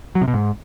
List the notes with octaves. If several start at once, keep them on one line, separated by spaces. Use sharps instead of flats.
F#3
C3
B2
G#2